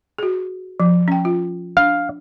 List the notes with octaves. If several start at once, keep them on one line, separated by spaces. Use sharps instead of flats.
F#4 G#4
F3
C#4 G5
F4
D4 F5